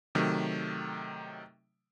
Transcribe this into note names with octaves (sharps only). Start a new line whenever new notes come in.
C3 D#3 F#3 A3